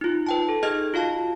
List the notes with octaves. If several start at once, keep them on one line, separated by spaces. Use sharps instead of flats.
D#4 F4
B4 G5 A5
A4
D#4 G#4 D#5 F6 G#6
F4 F#4 F5 A5